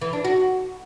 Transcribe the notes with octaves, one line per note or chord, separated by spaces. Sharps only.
E3
D4
F#4